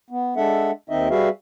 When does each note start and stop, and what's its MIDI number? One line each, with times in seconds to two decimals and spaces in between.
0.10 0.34 59
0.37 0.71 56
0.37 0.71 62
0.37 0.71 69
0.37 0.71 76
0.37 0.71 78
0.90 1.08 39
0.90 1.08 51
0.90 1.08 60
0.90 1.08 63
0.90 1.08 75
0.90 1.08 76
1.10 1.29 55
1.10 1.29 66
1.10 1.29 68
1.10 1.29 71
1.10 1.29 76
1.10 1.29 77